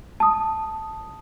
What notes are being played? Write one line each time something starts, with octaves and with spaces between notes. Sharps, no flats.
A5 D#6